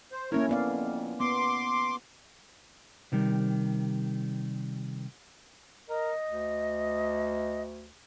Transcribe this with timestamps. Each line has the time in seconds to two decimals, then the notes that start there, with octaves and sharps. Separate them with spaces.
0.12 C5
0.32 A3 A#3 C#4 E4 A#4 C#5
0.49 F2 B3 D5 F5
1.20 B3 C6 D6
3.12 C3 D#3 G3
5.89 A#4 D#5
6.26 D2